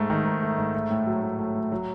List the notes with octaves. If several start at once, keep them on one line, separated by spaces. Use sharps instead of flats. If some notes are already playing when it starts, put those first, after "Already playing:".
Already playing: G#2 A3
D#3
G#2
A3
G#2
A3
A2
F#3
A2
A3
A2
F#3